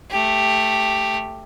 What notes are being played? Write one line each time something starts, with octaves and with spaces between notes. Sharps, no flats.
A3 G4